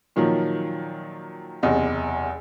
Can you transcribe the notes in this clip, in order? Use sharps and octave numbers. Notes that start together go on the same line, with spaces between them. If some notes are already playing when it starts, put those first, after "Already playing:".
A#2 D#3 F3 F#3
F#1 E2 C3 D#5